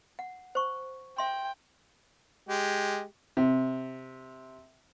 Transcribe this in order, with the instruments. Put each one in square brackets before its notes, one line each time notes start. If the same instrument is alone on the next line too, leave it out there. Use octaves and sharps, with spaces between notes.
[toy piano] F#5
C5 C#6
[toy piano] E5 C6 [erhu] G5
[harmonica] G#3 G4
[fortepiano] C3